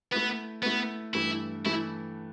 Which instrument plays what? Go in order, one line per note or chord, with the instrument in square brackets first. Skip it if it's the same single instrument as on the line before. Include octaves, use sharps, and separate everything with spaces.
[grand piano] A3 E4 B4 [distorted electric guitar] B3
[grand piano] A3 E4 B4 [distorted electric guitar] B3
[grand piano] G2 E3 A3 [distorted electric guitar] E4
[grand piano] E3 A3 [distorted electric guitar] E4